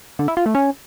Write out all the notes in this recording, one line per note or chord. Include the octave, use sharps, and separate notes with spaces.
D3
E4
F4
A3
C#4